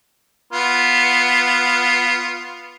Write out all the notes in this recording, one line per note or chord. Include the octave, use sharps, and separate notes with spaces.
B3 F4